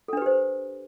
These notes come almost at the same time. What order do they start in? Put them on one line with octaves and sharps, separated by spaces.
A4 D4 B4 G4 C5